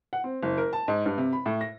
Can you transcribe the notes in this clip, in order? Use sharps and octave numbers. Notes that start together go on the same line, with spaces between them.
F#5
C4
F#1
A#4
A5
G#2
G2
C3
B5
A2
A#6